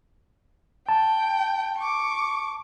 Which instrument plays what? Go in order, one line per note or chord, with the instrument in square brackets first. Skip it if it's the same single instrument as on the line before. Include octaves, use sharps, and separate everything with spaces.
[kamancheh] G5 [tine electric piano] A5
[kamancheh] C#6 D6